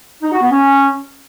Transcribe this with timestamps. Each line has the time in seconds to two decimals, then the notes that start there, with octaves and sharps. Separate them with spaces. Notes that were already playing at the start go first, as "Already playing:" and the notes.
0.23 D#4
0.32 F#4
0.41 B3
0.51 C#4